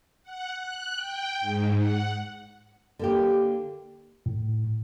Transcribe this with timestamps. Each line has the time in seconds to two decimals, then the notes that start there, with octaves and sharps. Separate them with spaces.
0.23 F#5
0.55 F#6
0.95 G5
1.41 G#2
1.76 F#5
2.99 D3 A#3 G4
4.26 A2